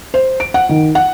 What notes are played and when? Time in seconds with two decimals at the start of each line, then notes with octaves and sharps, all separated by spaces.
0.14 C5
0.40 D7
0.54 F#5
0.69 D#3
0.95 F#5